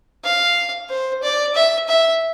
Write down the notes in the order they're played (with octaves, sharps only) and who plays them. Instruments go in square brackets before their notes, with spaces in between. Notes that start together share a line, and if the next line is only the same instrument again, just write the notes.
[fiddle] F5
C5
D5
E5
E5